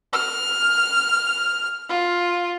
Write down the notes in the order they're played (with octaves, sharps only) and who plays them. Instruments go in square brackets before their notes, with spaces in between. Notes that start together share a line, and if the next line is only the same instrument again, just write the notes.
[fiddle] F6
F4